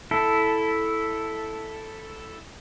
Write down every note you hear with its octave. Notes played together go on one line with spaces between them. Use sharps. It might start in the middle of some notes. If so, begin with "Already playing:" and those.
E4 A4